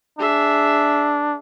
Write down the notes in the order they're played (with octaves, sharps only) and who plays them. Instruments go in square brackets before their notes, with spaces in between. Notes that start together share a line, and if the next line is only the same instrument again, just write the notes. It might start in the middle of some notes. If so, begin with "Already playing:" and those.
[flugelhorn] D4 [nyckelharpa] G#4 E5